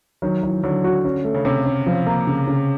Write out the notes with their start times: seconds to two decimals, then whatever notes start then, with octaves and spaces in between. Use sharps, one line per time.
0.22 D#3 F#3
0.43 E3 F#3
0.63 D3 F#3
0.84 F#4
1.05 C#4
1.24 A3
1.35 C#3
1.45 C3 C#4
1.65 C#4
1.86 F3
2.07 A#3
2.27 C#3
2.47 C#3